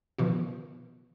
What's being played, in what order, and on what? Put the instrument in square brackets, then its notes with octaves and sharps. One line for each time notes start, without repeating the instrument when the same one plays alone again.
[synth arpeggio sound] B2 D#3 F3